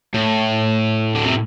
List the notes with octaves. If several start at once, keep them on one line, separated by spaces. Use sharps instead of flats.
A2
D3
C3